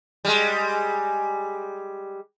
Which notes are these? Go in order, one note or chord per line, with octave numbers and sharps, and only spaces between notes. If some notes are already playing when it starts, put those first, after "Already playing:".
G3 G#3